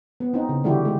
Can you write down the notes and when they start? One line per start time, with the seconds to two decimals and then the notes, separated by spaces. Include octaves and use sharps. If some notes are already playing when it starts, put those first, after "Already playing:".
0.20 B3
0.34 C4 D#4
0.49 C#3
0.64 D3 E3 G3 E4 F#4 G4
0.85 G#3 G4